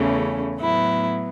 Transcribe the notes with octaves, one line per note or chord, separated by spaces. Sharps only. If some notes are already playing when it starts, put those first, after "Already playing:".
Already playing: E2 C#3 E3 A3 C#4
A2 F#3 B3 E4